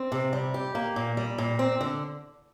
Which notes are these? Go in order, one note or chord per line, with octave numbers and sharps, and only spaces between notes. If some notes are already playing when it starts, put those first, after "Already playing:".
Already playing: C4
C3
G3
G4
A#3
A#2
G3
A#2
C4
D3